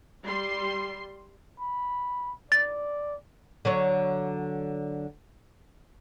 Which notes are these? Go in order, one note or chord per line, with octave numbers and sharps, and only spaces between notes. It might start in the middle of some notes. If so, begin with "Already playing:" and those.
G3 C6
B5
D5 A6
D3 F#3 C#5